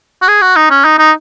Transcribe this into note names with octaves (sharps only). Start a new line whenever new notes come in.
F#4
G#4
F#4
D#4
C#4
D#4
D#4